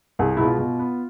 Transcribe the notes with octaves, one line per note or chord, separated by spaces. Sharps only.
C2 G#4
B2 G#3 B3 E4
F4
B2
B3